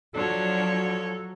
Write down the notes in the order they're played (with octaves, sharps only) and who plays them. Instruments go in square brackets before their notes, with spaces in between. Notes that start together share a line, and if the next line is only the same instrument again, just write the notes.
[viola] F3 C#5 [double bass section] F#3 [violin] D4 [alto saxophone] A4